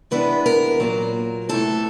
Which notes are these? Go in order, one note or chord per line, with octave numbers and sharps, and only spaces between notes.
C3 E3 G#3 B3 D4 B4
A#4
A#2 F#3 A#3
C3 E3 A3 A4